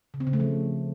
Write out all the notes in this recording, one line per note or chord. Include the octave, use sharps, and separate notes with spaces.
C#3
C4
C#3
A3
F3